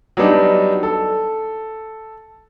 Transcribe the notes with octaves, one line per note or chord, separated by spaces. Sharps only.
F#3 G3 B3 D4 D#4
A4